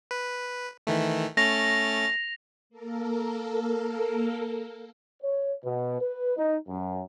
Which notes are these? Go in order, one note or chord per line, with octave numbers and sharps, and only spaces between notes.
B4
D#3 E3 A3
A3 C#4 A6 A#6 F7
A#3 A4 A#4
C#5
B2
B4
D#4
F#2